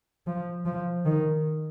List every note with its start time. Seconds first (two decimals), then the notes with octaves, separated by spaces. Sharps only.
0.27 F3
0.66 F3
1.05 D#3